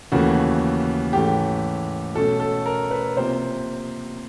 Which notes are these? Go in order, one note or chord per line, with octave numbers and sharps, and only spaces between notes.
D#2 C#3 E3 A3 F#4
G#2 E3 A3 C#4 G4
B2 F#3 A3 C#4 A4
A4
A#4
B4
C3 F3 A#3 C5